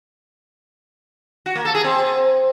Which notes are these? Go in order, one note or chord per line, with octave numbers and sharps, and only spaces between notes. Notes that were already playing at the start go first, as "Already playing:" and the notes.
F#4
A#3
A4
G#4
C4